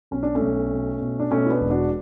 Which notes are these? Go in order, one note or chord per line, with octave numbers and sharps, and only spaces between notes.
B1 C#4
D4
A3 C#4
B1
B2
B2
D4
B2 A3 C#4
E4
B3 D4
E1
D4 F#4